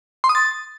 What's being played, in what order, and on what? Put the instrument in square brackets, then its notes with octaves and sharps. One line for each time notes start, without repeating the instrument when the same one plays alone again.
[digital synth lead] C6
D#6
A6